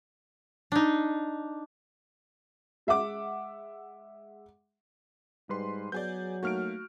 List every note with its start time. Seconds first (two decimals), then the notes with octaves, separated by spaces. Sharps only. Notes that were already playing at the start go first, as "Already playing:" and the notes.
0.72 D4 D#4
2.87 G#3 E5 F#5 D6
5.49 G#2 G3 B4 C6
5.92 F#3 B3 G#4 D5 G6
6.43 A3 A#3 D#4 F#4 F6 D7